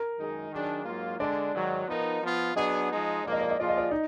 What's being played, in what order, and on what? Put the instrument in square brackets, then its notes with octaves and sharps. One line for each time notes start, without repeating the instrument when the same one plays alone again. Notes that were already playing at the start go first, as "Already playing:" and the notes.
Already playing: [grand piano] A#4
[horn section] F#2 D#3 G#3 D#4 G#4
D#3 F#3 D4 G#4
G#2 F#3 A#3 F4
[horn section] D3 G#3 D4 [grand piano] D5
[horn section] G#2 D#3 F#3
F3 B3 D#4 A#4
F3 B3 F4
[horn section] F#3 B3 D4 G#4 [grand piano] D#5
[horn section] F3 G#3 D#4
[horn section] G#2 F3 A#3 [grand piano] D5
[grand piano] D#5
D5
D#5
[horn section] F3 A#3 F4 G#4 [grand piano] D5
[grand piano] D#5
D5
D#4